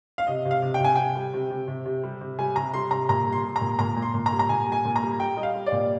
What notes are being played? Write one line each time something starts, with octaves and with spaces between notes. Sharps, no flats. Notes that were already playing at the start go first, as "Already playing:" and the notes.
F5
C3 D#5
C3
F5
C3
G5
C3 G#5
C3 G5
G3
C3
C3
C3
C3
G3
C3
G3 G#5
C3 A#5
G3 C6
C3 A#5
A#2 A#5
G3
C6
G3
A#5
A#2
A#2 A#5
A#2
C6
A#2
A#5
G3
A#5
A#2 G#5
G3
G#5
A#2
A#5
G3
G3 G5
G3 D#5
F5
G3
D5
A#2